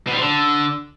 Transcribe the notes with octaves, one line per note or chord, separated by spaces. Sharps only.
B2
G3
F3
D3